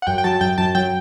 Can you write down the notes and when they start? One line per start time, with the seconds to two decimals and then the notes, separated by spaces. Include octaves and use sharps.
0.02 F#5
0.07 F#2 G5
0.18 G5
0.24 F#3 A5
0.41 F#2 G5
0.58 F#2 A5
0.75 F#3 G5